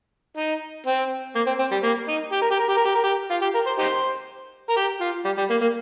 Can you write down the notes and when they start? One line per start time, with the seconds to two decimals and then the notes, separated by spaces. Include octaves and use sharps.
0.37 D#4
0.86 C4
1.35 A#3
1.47 C4
1.59 C4
1.72 G3
1.83 A#3
2.08 D#4
2.32 G4
2.42 A#4
2.51 G4
2.60 A#4
2.68 G4
2.77 A#4
2.86 G4
2.95 A#4
3.04 G4
3.31 F4
3.42 G4
3.55 A#4
3.67 C5
3.79 D#4 G4 C5
4.69 A#4
4.77 G4
5.01 F4
5.25 G3
5.38 G3
5.50 A#3
5.61 A#3